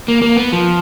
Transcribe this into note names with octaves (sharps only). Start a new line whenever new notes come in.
A#3
A#3
B3
F3